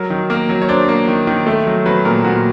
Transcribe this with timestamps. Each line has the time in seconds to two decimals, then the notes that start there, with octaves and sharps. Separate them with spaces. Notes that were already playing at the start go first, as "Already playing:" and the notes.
Already playing: F#3 A#4
0.10 D#3
0.30 A#3 A#4
0.49 F#3
0.62 C#5
0.68 D4 C5
0.89 A#3
1.08 D#3
1.27 D#3
1.47 A3
1.67 F#3
1.86 F#3 B4
2.05 A#2 A#4
2.24 A#2 F#4